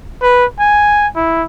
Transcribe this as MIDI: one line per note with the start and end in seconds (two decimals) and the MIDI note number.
0.22 0.45 71
0.59 1.07 80
1.16 1.44 64